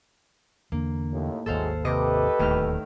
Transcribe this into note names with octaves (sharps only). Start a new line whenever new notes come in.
E2 D3 A#3
D#2 A2
G#1 D#2 A2 F#3 G#3 A4 C5 F5
C3 G4 A4 B4 D#5 D6
D1 D#2 A2 D#3 F6